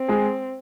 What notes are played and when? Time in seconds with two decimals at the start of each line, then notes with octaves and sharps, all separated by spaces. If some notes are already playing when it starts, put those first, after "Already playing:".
Already playing: C4
0.08 G#3 G#4